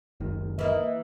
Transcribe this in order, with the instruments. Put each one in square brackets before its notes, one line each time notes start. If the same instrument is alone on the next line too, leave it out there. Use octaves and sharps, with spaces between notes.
[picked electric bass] F#1 C#2 D#3
[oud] E3 A#3 [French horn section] D#5